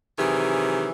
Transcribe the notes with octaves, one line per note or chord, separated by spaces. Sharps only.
C3 D#3 E3 F#3 G4 G#4